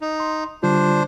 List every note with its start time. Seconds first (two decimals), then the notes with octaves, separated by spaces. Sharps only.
0.01 D#4
0.20 C6
0.63 D3 G3 D4 F4 C5